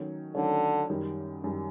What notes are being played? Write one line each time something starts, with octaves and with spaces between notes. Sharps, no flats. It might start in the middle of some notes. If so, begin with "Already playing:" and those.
Already playing: D#3 F#3 A3 C#4
D3 D#3 F#3 A3 C#4
F#2 D#3 G3
F#2 D#3 G3